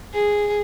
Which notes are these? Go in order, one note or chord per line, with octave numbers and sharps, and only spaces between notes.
G#4